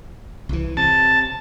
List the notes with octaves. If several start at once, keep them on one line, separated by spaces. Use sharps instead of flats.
C2 E3
C3 A5